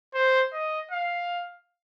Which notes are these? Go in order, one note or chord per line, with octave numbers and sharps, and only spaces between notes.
C5
D#5
F5